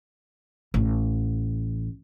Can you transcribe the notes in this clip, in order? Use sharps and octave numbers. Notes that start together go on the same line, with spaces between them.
A1